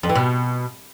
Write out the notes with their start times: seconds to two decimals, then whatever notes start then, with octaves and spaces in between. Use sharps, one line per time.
0.03 F2
0.09 E3
0.15 B2